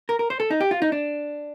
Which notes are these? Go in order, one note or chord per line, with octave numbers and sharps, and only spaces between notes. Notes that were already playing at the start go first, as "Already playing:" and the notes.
A#4
A#4
C5
A4
D#4
G4
F4
D#4
D4